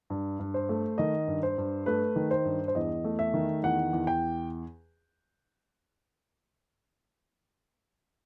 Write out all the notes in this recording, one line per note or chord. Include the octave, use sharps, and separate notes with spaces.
G2
G2
C5
A3
D#3 D#5
G2
C5
G2
A3 B4
D#3
C5
G2
C5
E2 D#5
A3
E5
D#3
E2 F#5
E2
G5